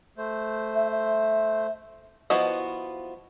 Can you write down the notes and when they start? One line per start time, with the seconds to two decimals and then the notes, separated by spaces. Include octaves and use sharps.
0.18 A3 C5
0.75 E5
0.92 E5
2.30 F3 B3 E4 F#4 D#5